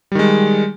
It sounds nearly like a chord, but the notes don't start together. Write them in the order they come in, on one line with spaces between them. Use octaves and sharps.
G3 D#3 G#3